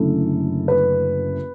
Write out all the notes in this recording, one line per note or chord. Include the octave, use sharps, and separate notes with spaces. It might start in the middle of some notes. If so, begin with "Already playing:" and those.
Already playing: F#1 F#2 D3 A3 E4 A4
B4